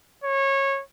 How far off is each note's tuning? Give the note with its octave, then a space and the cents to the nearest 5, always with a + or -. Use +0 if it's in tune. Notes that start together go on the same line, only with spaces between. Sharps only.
C#5 -20